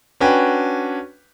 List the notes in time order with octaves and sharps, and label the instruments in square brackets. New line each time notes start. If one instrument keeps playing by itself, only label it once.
[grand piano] C#4 D4 F#4 B4 G5 G#5